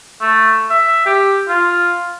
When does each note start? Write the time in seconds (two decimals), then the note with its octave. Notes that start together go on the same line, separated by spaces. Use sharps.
0.21 A3
0.70 E5
1.06 G4
1.49 F4